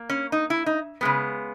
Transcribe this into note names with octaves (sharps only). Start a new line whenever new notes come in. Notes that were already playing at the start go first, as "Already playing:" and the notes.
Already playing: A#3
C#4
D#4
E4
D#4
C#3 G#3 B3